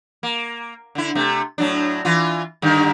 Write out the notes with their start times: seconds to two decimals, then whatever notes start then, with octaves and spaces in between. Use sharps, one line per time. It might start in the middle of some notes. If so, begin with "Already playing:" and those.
0.23 A#3
0.95 D3 E4
1.15 C3 A3
1.58 A2 F#3 D4
2.05 E3 F4
2.62 G2 D3 D#3